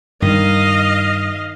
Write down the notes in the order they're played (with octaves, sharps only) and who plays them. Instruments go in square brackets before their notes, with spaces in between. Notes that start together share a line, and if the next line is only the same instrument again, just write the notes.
[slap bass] G2 G3 [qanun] D#3 [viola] D#5 F5